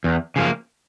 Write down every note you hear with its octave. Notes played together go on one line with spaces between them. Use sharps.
E2
C#3 F3 A#3